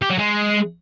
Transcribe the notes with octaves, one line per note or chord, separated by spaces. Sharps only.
G4
F#3
G#3